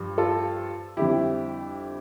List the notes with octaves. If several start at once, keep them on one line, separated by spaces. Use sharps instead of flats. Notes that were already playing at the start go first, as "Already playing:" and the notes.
Already playing: G2 F3
F4 A4
F2 D3 G3 E4 G4